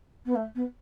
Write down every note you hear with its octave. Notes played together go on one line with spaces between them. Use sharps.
B3
A3
B3